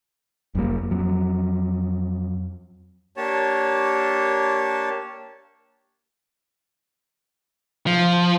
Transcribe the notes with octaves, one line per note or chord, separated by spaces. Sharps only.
F#1 F2 G3 A#3
F2 F#3
A#3 D4 G4 C#5 A5
F3